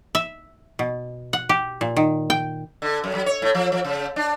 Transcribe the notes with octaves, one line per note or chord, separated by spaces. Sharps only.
E5
B2
F#5
G4
A#2
D#3
G5
D3
F#2
F#3
C#5
A2
F3
F3
C#3
D4